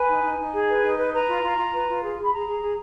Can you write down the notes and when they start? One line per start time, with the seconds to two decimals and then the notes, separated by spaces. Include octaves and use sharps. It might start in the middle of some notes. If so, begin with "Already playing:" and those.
Already playing: B4 G#5
0.09 D#4
0.24 D#4
0.38 D#4
0.53 G#4
0.68 B4
0.83 D#4
0.97 B4
1.12 B4 A#5
1.27 F4
1.43 F4
1.57 F4
1.72 B4
1.88 F4
2.02 G#4
2.17 G#4
2.23 B5
2.32 G#4 A#5
2.47 G#4
2.61 G#4